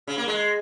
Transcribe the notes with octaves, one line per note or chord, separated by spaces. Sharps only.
C#3
A#3
G#3